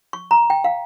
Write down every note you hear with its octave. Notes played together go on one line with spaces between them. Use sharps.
C#6
A#5
G5
F5